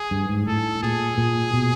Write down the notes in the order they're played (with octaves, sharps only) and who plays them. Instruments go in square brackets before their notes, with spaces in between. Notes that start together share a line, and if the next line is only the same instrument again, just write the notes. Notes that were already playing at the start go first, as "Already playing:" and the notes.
Already playing: [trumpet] G#4
[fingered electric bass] G2
G#2
[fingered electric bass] A2 [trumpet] A4
[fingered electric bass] A#2 [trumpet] G#4
[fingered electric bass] A#2
B2